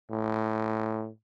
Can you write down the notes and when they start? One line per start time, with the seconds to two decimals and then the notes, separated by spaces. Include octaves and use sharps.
0.10 A2